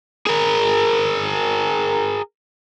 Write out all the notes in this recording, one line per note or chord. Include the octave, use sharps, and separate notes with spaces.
G#4 A#4